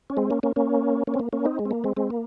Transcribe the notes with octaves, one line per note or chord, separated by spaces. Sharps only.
C#4
G#3 C4
A#3 C#4
A#3 C#4
A#3 C#4
A#3 C#4
C4
A#3
A#3 C#4
C4 D#4
G#3
C4
A#3
G#3 C4
G#3 C4
A#3